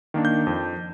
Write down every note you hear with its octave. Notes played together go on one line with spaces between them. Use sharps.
D#3 A#3 D4
G6
F2